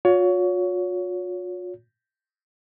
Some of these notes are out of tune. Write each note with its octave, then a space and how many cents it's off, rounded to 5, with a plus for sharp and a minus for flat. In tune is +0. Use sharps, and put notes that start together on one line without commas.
F4 +45 C#5 +25